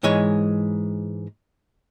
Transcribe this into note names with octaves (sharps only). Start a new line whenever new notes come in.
G#2 E3 G#3 C#5